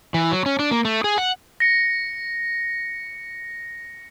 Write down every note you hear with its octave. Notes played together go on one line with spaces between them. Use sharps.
E3
F#3
C#4
D4
A#3
A3
G#4
F#5
A#6 C#7